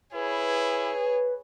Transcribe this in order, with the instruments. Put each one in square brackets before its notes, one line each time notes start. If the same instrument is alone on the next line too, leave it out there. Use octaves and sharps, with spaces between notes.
[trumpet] E4 [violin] G#4 C#5 [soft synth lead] B4